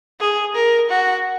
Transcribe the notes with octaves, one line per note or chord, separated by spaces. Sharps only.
G#4
A#4
F#4